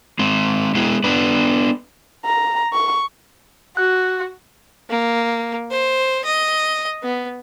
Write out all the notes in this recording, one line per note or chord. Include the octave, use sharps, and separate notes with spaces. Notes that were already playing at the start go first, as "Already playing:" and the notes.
G#3 C4
G#3 B3 E4 G#4
B3 D4 B4
A#5
C#6
F#4 F#6
A#3
C5
D#5
B3